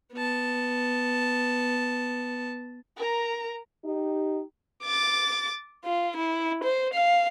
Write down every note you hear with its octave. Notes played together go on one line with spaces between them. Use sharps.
B3 A5
A#4 A#5
D#4 G4
D6 A6
F4
E4
C5
F5